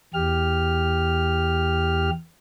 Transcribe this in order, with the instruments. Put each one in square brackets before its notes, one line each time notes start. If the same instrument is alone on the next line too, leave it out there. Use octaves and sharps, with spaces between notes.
[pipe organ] E2 G4 F6